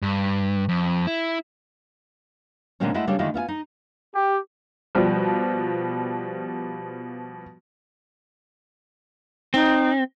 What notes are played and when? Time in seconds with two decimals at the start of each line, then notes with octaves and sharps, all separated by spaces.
0.02 G2
0.69 F2
1.07 E4
2.80 A#2 D3 E3 G#3 C4 C#4
2.94 G#3 A3 E4 F#5
3.07 C#3 G3 D4 A4 C#5
3.19 D3 D#3 G#3 A3 E4 F4
3.34 B3 F4 E5 G#5
3.48 D#4
4.16 G4
4.95 B2 F3 G3
9.54 C4 D#4